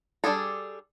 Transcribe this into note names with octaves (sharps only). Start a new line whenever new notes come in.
G3 D4 F4 G#4 A4